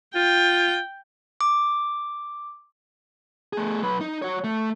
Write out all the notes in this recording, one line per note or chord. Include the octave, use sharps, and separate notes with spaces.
F4 G5
D6
A3 G#4
F#3 B4
D#4
F#4 C#5
A3